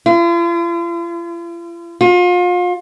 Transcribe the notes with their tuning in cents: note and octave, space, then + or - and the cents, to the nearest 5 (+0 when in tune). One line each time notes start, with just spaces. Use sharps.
F4 -45
F4 +35